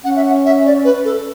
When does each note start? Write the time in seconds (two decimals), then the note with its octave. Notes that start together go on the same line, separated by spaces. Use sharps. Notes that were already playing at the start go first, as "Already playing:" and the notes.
0.04 C#4 F#5
0.16 E5
0.25 F#5
0.45 E5
0.66 D5
0.84 B4
1.05 A4